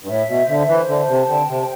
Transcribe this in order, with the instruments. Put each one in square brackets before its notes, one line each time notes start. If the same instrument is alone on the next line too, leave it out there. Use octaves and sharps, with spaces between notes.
[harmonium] G2
[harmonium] A2 [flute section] E5
[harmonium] B2
[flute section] C5
[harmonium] D3
[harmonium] E3 [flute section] C5
[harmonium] D3
[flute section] A5
[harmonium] C3
[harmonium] D3 [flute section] G5
[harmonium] C3
[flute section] C5